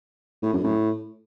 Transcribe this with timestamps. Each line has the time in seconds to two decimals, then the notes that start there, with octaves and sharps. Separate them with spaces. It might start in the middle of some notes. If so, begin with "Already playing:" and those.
0.42 A2
0.53 F#2
0.63 A2